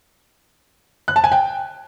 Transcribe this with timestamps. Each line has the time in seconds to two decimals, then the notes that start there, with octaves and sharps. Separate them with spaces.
1.08 F#6
1.16 A5
1.24 G#5
1.32 G5